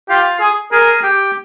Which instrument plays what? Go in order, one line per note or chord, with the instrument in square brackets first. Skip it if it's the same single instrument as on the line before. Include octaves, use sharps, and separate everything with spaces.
[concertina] F4 F5 [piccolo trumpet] G4
[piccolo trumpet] G#4
[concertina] G#4 G#5 [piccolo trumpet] A#4
[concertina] G4 G5